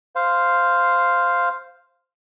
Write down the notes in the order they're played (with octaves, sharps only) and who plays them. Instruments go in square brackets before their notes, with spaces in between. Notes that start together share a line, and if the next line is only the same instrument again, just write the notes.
[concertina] C5 F5